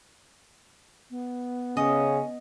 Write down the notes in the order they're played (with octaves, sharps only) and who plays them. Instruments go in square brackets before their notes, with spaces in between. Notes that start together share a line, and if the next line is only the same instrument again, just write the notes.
[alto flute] B3
[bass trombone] C#3 [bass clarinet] C#4 [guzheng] D#5